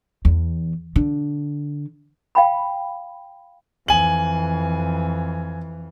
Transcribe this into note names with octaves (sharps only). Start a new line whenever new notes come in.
E2
D3
F5 G5 B5
F2 E3 G#5 F#7